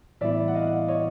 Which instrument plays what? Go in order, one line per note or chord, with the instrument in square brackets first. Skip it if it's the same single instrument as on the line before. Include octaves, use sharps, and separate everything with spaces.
[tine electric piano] A2 E3 G3 B3 E4 [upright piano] D5 E5
[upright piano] F#5
D#5 F5
C#5 D#5